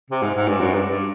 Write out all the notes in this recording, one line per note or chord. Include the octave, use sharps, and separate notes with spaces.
C3
G#2
G#2
G2
F#2
G2
G2